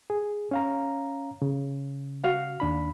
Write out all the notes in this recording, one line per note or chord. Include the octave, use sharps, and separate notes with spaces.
G#4
C#4 F5 A#5
C#3
F#4 F5
D#2 D4 B5